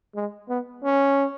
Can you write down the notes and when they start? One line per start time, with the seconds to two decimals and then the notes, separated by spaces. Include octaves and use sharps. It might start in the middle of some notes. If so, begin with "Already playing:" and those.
0.15 G#3
0.49 B3
0.84 C#4